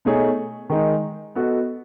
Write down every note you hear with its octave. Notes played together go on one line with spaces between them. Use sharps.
B2 A3 D#4 G#4 C#5
D#3 G#3 D#4
B3 F#4 A4 D#5